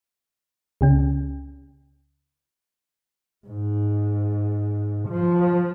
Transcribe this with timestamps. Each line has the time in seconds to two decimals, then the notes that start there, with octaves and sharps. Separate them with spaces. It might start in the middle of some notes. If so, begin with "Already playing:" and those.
0.81 C#2 C#3 C#4
3.47 G#2
5.09 F3